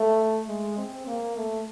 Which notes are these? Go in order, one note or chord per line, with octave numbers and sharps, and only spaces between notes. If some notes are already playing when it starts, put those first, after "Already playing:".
Already playing: A3
G#3
C4
A#3
A3